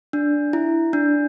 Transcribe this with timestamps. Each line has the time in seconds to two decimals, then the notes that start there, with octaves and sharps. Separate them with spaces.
0.13 D4
0.53 E4
0.93 D4